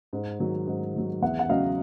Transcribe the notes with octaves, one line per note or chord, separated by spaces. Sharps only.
G#2
D#3 F#3
G#2
D#3 F#3
E2 E5 F#5
F#5
C#3 F#3 D#5 F5